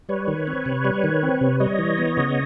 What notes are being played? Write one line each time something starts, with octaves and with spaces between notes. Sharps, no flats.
G3 B4 C#5
D#3
C4
C3
G3
D#3
C4
C3
G3 C#5 D#5
E3
B3
C#3